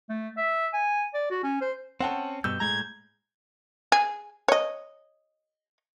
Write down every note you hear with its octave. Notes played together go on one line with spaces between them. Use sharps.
A3
E5
G#5
D5
F#4
C#4
C5
C4 C#4 F#5 G5 A5
G2 B2 E6 G6
A2 G#3 A#5 G#6
G#4
C#5 D#5